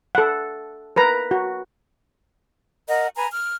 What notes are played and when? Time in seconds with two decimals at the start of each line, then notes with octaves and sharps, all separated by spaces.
0.15 A4 F#5
0.96 A#4 B4 A#5
1.31 F#4
2.87 A#4 D#5 F#5
3.15 B4 G#5 A#5
3.31 F6